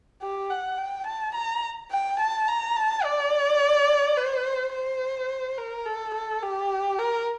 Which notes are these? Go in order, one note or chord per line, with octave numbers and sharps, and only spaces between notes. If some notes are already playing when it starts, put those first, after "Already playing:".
G4
F#5
G5
A5
A#5
G5
A5
A#5
A5
D5
C5
C5
A#4
A4
A4
G4
A#4